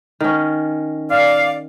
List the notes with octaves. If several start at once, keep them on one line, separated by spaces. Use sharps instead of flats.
D#3 C#4
D5 F5